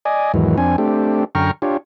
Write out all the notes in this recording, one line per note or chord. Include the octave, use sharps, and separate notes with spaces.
D5 D#5 G#5
E2 G#2 D#3 E3 F#3
F2 C4 D4 G#5
A3 C4 D4 G4
F#2 D3 G5 A#5 C#6 F6
D4 F4 G4 C#5